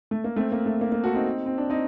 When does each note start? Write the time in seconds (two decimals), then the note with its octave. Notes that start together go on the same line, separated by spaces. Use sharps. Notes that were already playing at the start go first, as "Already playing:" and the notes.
0.11 A3
0.24 A#3
0.36 A3 C4
0.52 A#3
0.66 A3
0.81 A#3
0.92 A#3
1.04 F#4 A4
1.14 C4 D#4
1.46 C4
1.58 D4
1.70 C4 D#4